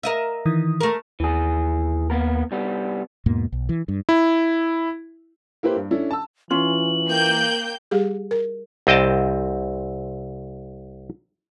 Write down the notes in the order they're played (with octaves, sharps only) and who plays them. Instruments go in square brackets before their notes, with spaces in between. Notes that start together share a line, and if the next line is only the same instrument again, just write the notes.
[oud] A#4 D#5 E5
[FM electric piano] D#3 E3 D#6
[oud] A3 A#4
[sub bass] D#2 [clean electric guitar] E3 G#4
[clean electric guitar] A#3 B3 A#4
C2 G3 B3
[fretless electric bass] E2 G#2 B2 A#3
B1
E3
G2
[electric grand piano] E4
[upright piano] A#3 E4 G4 B4 C5
G2
C#4 D4 E4 A4
A5 E6
[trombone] E3 [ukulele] C#4 F4 [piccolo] F#7
[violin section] A#3 G5 G6
[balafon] G3 G4 G#4
A#4
[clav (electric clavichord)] C2 C4 D#5 G5 A5